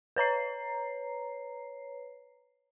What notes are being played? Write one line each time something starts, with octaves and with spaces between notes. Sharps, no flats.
B4 C#5 A#5 C7